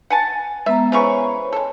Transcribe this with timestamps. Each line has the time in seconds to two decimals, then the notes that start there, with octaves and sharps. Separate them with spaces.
0.10 F#5 G#5 A5
0.66 G#3 B3 E5 A#5
0.92 C#3 E3 C5 C#5 C#6
1.52 G#3 A4